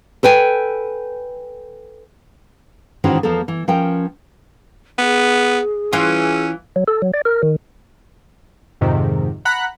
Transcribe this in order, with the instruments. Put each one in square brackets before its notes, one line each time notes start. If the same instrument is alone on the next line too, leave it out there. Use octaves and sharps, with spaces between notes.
[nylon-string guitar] A4 B4 G5 G#5
G#2 D#3 E3 C#4 F#4 C5
E2 F3 A#3 A4
E3
F3 C#4 A#4 G5
[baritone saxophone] B3 [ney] G#4
[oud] E3 F4 [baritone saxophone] C#4
[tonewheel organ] F#3
A4
F#3
D5
A#4
D#3
[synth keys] F2 G#2 C3 D#3
F#5 A#5 B5 F#6